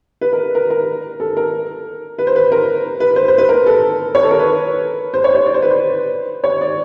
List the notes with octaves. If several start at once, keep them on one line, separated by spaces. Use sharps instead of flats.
B4
A#4
A#4
A#4
A4
A#4
B4
C5
B4
A#4
B4
C5
C5
B4
A#4
A4
C#5
A4
A#4
B4
C5
C#5
C#5
D5
C5
B4
C5
C#5
D5